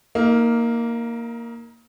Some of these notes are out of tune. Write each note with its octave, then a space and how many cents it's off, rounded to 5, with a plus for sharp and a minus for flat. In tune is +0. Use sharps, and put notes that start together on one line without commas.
A#3 +0 D#4 +30